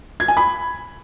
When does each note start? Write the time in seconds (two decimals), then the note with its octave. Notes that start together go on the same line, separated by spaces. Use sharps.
0.20 G#6
0.28 G#5
0.37 B5